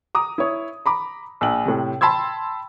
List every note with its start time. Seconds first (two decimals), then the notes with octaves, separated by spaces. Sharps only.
0.15 A#5 D6 D#6
0.38 E4 C#5
0.86 A#5 B5 D6
1.41 A#1 G5 F#7
1.66 A2 C3
2.01 G5 A5 B5 C6 E6 G#6